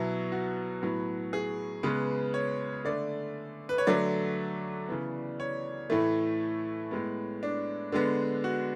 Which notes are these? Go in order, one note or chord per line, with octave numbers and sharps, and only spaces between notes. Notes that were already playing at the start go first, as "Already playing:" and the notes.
Already playing: B2 F#3 B3 E4
F#4
A2 F#3 B3
G#4
C#3 G#3 B3 B4
C#5
D3 A3 D5
B4
C#5
D3 F#3 A3 D5
C#3 E3 B3
C#5
A2 E3 A3
A2 G#3 B3
D4
D3 G#3 B3
F#4